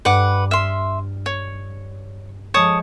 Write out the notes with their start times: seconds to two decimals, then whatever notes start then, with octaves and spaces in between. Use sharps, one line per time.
0.05 G2 B4 F#5 D6
0.51 E5 C6 F6
1.26 C#5
2.54 F3 G#3 C#5 A5 D#6 G6